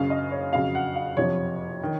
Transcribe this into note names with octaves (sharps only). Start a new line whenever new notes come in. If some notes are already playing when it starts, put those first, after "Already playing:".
Already playing: F#1 F#2 C#3 F5
D#5
C#5
F2 C#3 F#3 F5
F#5
F5
F#1 F2 C3 F3 C#5
D#3